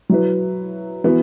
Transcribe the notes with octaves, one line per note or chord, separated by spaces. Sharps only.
F#3 E4 B4
E3 B3 F#4